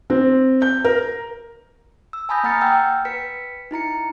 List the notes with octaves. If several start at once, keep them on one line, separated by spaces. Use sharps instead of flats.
C4
G6
A#4
E6
G#5 A5 B5 D#6 G6 A#6
A#3 F#5 A#5 F6 A6 C#7
G5 E6 F6 G6
B4 B6 C#7
D#4 E4 A#5 C#7